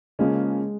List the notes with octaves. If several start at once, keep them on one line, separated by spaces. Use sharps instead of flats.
C#3 F3 G#3 A#3 C#4